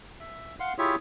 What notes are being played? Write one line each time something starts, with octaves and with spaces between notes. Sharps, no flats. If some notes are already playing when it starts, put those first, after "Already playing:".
E5
F5 F#5 C6
E4 F4 G4 G#4 C#5 E5